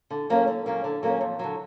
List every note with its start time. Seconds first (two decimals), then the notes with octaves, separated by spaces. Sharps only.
0.10 D3
0.30 F#3 A#3 C#4
0.47 D3
0.66 F#3 A#3 C#4
0.84 D3
1.03 F#3 A#3 C#4
1.21 F2
1.39 D3 F#3